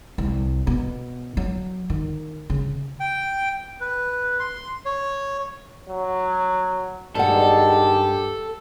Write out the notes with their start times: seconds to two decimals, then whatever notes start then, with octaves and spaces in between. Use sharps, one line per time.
0.18 C2
0.67 B2
1.37 F#3
1.90 D#3
2.50 C#3
3.00 G5
3.81 B4
4.40 C6
4.86 C#5
5.89 F#3
7.15 G2 B2 D#3 G#3 G4 A4 F#5